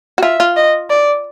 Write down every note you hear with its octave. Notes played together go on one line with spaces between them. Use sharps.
F#4
F4 E5
F4
D#5
D5